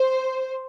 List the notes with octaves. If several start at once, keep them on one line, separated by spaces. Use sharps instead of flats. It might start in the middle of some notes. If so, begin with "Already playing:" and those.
Already playing: C5